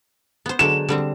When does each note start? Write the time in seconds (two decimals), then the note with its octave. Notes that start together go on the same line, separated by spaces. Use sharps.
0.46 B3 C5
0.59 D3 F#3 G#3 E7
0.89 D3 G3 C4